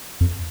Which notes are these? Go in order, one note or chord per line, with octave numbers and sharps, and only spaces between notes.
F2